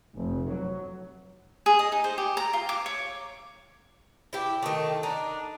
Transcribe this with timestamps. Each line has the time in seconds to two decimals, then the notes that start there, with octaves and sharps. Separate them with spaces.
0.14 F1
0.49 F#3
1.66 G#4
1.79 D#5
1.92 D#4
2.04 C5
2.18 G4
2.37 A#5
2.53 F4
2.69 D6
2.86 C#5
4.33 E4 G4
4.62 D#3 A3
5.03 D4 D#4